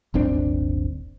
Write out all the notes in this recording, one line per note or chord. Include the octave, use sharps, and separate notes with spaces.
D#1 G#1 C4 D4